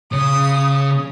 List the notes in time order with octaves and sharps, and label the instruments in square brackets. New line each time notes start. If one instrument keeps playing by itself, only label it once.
[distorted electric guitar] C#3 [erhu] D#6